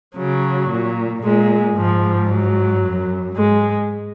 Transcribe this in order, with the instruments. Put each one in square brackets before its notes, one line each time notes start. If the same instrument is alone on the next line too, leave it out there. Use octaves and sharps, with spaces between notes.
[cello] C#3 [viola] F#3
[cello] A#2
[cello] A#2 [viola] G#3
[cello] G#2 [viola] F3
[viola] F#3
[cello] F#2
[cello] G#2 [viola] G#3